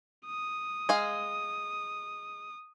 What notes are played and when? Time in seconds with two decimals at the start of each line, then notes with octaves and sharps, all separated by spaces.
0.26 D#6
0.89 G#3 F5